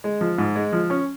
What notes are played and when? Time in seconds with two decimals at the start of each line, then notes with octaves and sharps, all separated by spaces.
0.04 G#3
0.21 F3
0.38 G#2
0.56 G#3
0.73 F3
0.90 C#4